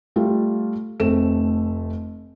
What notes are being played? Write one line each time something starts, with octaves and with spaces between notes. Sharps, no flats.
G3 A3 F4
F1 A3 C4 A4 E7